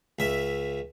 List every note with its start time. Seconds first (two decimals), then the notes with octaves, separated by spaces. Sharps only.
0.19 C#2 E5